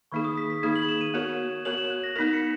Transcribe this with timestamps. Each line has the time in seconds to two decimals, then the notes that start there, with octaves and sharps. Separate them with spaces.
0.12 D#3 A#3 D#4 G#4 C#6
0.25 D#6
0.37 B6
0.50 B6
0.63 D#3 A#3 D#4 G#4 G#6
0.76 F#7
0.88 E7
1.01 D#7
1.14 B3 F#4 A#4 C#5
1.65 B3 F#4 A#4 C#5 F#7
1.78 E7
1.90 F#6
2.04 A#6
2.16 B3 D#4 A#4 B6
2.27 B6
2.33 C#7